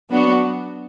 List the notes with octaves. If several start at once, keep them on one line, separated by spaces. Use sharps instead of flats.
F#3 B3 D4 F#4